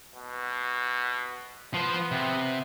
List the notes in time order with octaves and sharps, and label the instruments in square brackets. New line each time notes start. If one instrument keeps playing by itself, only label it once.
[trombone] B2
[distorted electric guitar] F3 C5 [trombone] B3
[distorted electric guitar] C3